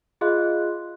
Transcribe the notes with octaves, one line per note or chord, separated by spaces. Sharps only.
F4 G#4 D#5 F5 C6 F#6